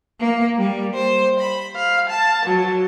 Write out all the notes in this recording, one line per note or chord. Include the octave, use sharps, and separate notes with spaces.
A#3
G3
C5
B5
F5
A5
F#3